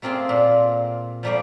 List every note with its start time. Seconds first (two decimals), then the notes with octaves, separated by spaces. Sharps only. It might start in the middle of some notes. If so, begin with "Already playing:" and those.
0.02 A3 A#3 C4 F4 G#4
0.29 A#2
1.23 F3 G3 A3 A#3 G4 D5